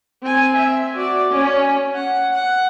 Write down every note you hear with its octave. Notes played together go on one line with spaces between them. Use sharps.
C4 G#5
E5
F#4 D5
C#4
F#5
F#5